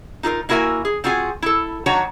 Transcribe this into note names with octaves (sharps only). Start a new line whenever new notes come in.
D#4 F4 G#4 A#4
A#3 E4 F#4 A#4 E5 G#5
G#4
C4 F4 F#4 G#4 G#5
E4 A4
D#3 F#3 D4 F#4 C#5 A#5